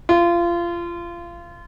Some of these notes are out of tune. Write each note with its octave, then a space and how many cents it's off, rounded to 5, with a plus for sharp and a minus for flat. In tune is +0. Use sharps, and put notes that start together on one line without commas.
F4 -25